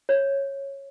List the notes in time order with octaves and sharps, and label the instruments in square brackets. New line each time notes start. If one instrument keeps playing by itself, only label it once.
[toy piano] C#5